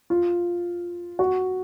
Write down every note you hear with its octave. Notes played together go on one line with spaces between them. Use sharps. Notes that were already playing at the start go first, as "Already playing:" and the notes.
F4
F#4